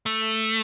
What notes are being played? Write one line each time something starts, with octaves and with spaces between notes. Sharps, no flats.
A3